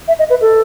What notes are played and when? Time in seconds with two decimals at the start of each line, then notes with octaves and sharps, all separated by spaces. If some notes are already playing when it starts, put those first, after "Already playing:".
0.08 E5
0.19 D#5
0.30 B4
0.41 A4